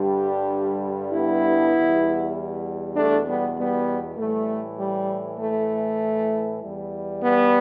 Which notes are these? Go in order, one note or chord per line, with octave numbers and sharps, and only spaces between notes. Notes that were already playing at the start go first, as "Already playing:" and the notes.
Already playing: G2 D3 G3 D4 G4
B3 E4
E2 B2 G3
A3 D4
G3 B3
G3 B3
A2 E3 G3 A3
G3
A3
E2 E3 G3
G3 B3